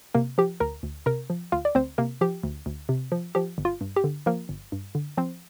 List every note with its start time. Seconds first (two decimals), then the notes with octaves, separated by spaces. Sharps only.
0.15 C3 A#3 A#4
0.38 F3 G4
0.60 D2 A#4 A#5
0.83 D2
1.06 C3 A#4 A#5
1.30 F3
1.52 D2 F4 F5
1.65 D5
1.75 D2 C4 C5
1.98 C3 A#3 A#4
2.21 F3 G4
2.43 D2
2.66 D2
2.89 C3
3.12 F3
3.35 F3 G4
3.58 G1
3.65 F4
3.81 G2
3.96 G4
4.04 D3
4.26 F3 A#3 A#4
4.49 G1
4.72 G2
4.95 D3
5.17 F3 C4 C5